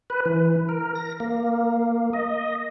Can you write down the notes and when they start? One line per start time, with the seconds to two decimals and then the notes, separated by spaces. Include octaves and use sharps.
0.10 B4
0.25 E3
0.69 A#4
0.95 A#6
1.20 A#3
2.13 D#5